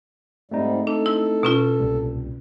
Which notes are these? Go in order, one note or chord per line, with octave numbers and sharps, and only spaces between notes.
G#2 G3 A3 C4 D#4
D4 A4
E4
B2 C#4 F4
C2 A#2 G3